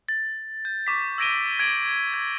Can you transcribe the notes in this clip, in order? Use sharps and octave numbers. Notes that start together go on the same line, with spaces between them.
A6
G6
C#6 D6 B6
E6 G#6 A#6 D7 D#7 G7
G#6 D7 F#7
G#6